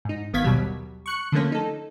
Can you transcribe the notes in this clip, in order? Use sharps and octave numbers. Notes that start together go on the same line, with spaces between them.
G#2 D#4
G#1 D#3 B3 F5 G#6 B6
D#2 B2 F#3 G3
C#6 F#6 C#7
D3 F3 A3 A#3 C#4
D#4 A4